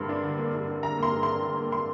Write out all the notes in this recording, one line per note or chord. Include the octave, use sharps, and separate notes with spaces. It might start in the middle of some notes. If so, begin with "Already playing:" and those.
Already playing: G2 D3 A#3 C6
D4
D3
A#3
G2
D4
D3 A#5
A#3 C6
G2
D4 C6
D3
A#3
C6